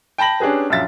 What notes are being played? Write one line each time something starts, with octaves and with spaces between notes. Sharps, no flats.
G5 A5 B5 A#6 F#7
C#4 D4 G4 G#4 B4
A#1 F#2 F4 E5 A6